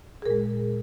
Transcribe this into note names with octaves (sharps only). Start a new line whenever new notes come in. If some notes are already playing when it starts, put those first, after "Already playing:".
G#4
A#2 G#3 A#4